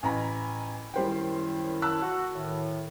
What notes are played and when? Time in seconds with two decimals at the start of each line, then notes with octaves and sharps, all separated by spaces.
0.03 A1 G#5 A#5 B5
0.94 F#2 D#3 G3 E4 C5 G5
1.82 A5 E6 F#6
2.02 F#4
2.34 A2 D#3